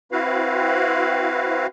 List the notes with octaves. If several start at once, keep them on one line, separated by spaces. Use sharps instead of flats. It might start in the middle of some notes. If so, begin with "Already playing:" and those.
C4 E4 F#4 B4 F5